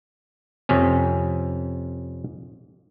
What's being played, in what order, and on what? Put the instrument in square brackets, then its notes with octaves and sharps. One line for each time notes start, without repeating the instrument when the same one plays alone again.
[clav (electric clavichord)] F2 C3 C#4